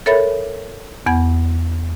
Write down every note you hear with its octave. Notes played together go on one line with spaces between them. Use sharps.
A4 A#4 C#5 E5 B5 A6
E2 B3 F#5 G#6